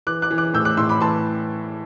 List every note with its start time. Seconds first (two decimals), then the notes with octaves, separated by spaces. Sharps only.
0.07 E3 D6 F#6
0.22 D6 F#6
0.31 E3
0.38 D6 F#6
0.54 A2 E6 G6
0.65 D6 F#6
0.77 A2 C6 E6
0.89 B5 D6
1.01 E3 A5 C6